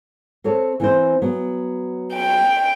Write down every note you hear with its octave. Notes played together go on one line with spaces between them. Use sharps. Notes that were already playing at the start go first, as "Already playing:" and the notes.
C4 A4 C#5
E3 C4 C5
F#3 B3
G5